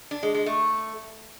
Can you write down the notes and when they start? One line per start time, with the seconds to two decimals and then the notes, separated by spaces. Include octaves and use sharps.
0.11 D4
0.23 G#3
0.34 G#3
0.46 A3